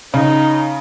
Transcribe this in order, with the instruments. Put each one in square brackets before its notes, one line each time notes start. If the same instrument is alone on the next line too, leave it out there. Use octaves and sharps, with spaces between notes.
[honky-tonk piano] C#3 [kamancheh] D#4